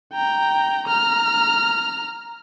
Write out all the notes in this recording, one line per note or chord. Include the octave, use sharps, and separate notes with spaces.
G5 A#5
A#5 F6